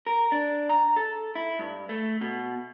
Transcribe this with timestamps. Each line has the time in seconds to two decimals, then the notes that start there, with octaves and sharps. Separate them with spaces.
0.07 A#4
0.32 D4
0.69 A#5
0.96 A4
1.35 E4
1.59 G2
1.89 A3
2.21 B2